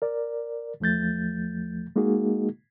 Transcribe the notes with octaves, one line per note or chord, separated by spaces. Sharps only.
A#4 D5
E2 F3 A3 G6 A6
G#3 A#3 D#4 F#4 G#4